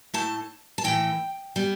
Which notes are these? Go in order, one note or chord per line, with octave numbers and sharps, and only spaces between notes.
A2 A3 A5
A5
A2 E3 A3 G5
G3 B3